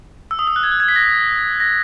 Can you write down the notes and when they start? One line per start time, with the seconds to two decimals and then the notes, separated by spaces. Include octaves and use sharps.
0.31 E6
0.39 D#6
0.47 E6
0.56 F#6
0.63 G#6
0.72 F#6
0.80 G#6
0.88 B6
0.96 A#6
1.60 A#6